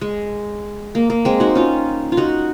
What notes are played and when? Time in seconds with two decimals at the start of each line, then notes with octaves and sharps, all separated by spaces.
0.01 G#3
0.95 A#3
1.10 A#3
1.25 G#3 C4
1.40 D#4 F#4
1.55 C#4 F4
2.12 F4
2.17 D#4 F#4